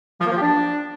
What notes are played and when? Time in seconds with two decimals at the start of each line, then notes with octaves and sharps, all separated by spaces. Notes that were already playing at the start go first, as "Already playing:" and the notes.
0.21 F3
0.26 A#3
0.31 F3
0.37 G4
0.42 D4